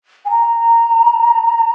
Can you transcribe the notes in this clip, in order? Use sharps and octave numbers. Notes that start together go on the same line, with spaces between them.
G#5
A#5